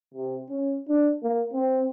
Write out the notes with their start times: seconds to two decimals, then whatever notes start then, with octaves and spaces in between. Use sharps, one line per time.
0.14 C3
0.50 C#4
0.89 D4
1.23 A#3
1.53 C4